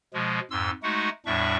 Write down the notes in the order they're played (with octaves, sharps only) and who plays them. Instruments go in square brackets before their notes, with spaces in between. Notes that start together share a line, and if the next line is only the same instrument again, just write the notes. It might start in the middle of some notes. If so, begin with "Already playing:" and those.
[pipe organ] B2 F3 G#3
F2 G#2 C6 E6
G#3 A3 D#4 F#4 F#5
E2 A2 G3 D4 E5 C#6